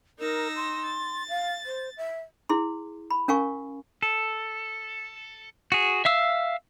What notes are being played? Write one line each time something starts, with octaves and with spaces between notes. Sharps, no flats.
D#4 A#4 E6 A#6
C6
A6
F5
C5
E5
E4 G#4 C6
B5
C#4 A#4 F5 G#5 C#6
A4
F#4 G#4
E5 F5 E6